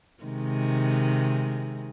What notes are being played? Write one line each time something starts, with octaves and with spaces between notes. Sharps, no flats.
C3 D#3 G#3